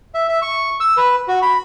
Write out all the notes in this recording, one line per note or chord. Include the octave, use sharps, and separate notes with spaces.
E5
E5
C#6
E6
B4
F#4
B5